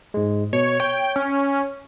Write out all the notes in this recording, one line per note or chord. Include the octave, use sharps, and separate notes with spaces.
G#2 G#3
B2 C#5
C#5 G5
C#4